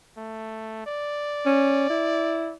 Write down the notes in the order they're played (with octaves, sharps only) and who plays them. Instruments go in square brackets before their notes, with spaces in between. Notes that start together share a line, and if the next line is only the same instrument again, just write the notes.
[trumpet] A3
D5
[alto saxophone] C#4
E4